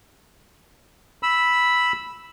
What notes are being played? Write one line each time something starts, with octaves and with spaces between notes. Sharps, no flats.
B5 E6